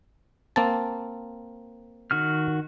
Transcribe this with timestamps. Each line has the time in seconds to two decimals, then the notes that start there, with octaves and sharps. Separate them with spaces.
0.56 A#3 C4 A5
2.11 D#3 F#4 F6